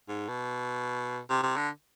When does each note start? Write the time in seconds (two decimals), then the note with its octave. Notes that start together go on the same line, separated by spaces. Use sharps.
0.08 G#2
0.28 B2
1.30 C3
1.43 C3
1.57 D3